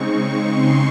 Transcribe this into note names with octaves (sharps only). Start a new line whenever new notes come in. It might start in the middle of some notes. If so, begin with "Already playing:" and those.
Already playing: C#3 G#3 C4 D#4 C#6
C6